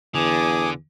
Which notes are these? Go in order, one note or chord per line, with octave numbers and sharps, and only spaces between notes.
E2 D3 G#5 D6 D#6